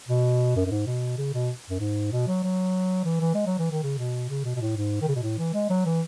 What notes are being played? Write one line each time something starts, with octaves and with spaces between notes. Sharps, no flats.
B2
F#2
F#2
G#2
B2
C#3
B2
F#2
G#2
B2
F#3
F#3
E3
E3
G#3
F#3
E3
D#3
C#3
B2
C#3
B2
B2
A2
G#2
D#3
C#3
B2
A2
E3
G#3
F#3
E3